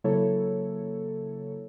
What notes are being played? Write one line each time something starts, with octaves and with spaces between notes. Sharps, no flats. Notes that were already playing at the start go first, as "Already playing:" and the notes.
C#3 F#3 A#3 E4 A4 C#5